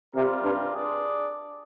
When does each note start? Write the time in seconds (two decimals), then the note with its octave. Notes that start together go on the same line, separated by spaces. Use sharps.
0.15 C3 G3 C4 F4 A#4 D5
0.43 G2
0.72 D4 G#4 D5